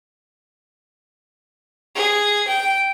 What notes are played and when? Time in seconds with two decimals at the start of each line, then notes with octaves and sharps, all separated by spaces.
1.95 G#4
2.47 G5